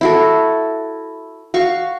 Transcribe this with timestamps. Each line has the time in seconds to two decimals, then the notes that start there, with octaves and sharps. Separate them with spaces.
0.01 E4 F#4 A4
1.54 F#4 F5 C#6